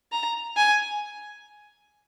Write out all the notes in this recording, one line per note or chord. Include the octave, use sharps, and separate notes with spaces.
A#5
G#5